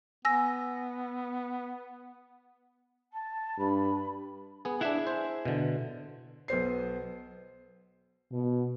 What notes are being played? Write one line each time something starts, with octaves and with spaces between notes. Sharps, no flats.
B3 G#5 E6 A#6
A5
G2 B5
B3 G#4
D4 E4 G#4 E5 F#5
C5
B2 D3
B1 B3 C5 C7
B2